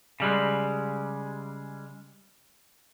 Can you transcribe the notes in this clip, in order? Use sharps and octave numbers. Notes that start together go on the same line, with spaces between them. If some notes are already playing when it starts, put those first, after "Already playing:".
C#3 G3 G#3